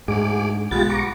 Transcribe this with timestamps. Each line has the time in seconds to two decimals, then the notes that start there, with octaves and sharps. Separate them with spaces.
0.08 D2 G#2 G#4 D6
0.71 B1 F3 G#3 B3 F4 G4 A6
0.90 A#5 C#6 D6